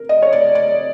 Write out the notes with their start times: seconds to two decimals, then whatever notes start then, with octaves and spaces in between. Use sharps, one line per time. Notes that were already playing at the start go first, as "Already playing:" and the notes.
Already playing: A#4
0.09 D#5
0.22 C#5
0.33 D5
0.55 D5